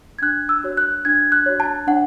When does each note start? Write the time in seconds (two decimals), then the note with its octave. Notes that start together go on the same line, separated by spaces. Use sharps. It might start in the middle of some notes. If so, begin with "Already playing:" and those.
0.19 G#6
0.22 D4 F#6
0.49 E6
0.64 F#4 C#5
0.77 F#6
1.05 D4 G#6
1.32 F#6
1.46 F#4 C#5
1.60 A5
1.87 D4 F#5